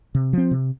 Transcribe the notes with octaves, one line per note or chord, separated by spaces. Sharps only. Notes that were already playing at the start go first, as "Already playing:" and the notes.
C3
F3 C4
C3